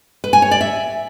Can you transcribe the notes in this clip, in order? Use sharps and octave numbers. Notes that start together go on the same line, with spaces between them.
B4
G#5
C#5
D5
E5